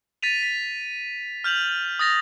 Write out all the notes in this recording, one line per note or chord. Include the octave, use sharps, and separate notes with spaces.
A6 B6 D#7 F7
B6
F6 G6 F7 F#7
D#6 A6 A#6 F7